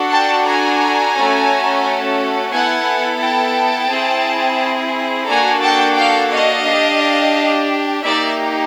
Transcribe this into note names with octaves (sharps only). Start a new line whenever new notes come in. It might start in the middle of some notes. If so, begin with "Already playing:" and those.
Already playing: D4 F#4 A4
G5 A5
G#5 A#5
A3 C#4 F#4 A4
B3 E4 A4 F#5 G#5
G5 A5
C4 E4 G#4
A#3 D4 F#4 A4 G#5 A#5
G5 A5
F5 G5
D#5 F5
D4 G4
A#3 D#4 G4 D5 E5